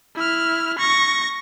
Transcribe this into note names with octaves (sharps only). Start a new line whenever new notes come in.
E4 F6
C#6 A#6